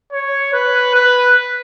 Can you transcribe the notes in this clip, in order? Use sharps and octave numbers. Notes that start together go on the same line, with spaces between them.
C#5
B4
B4